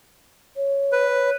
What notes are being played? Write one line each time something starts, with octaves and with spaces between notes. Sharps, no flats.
C#5
B4